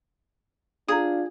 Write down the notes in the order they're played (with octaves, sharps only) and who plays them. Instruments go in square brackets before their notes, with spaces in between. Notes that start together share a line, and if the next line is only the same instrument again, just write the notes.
[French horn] D4 [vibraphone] F4 F5 [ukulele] G#4 [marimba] A#5 D#6